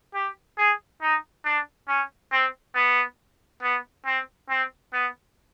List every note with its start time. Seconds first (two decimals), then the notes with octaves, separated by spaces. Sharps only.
0.14 G4
0.58 G#4
1.02 D#4
1.45 D4
1.88 C#4
2.32 C4
2.75 B3
3.63 B3
4.06 C4
4.50 C4
4.93 B3